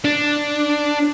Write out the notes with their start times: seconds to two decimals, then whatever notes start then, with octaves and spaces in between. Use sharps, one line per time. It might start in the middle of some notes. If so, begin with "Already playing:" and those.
0.04 D4